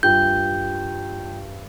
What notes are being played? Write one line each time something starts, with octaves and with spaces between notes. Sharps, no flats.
G2 F4 G5 G6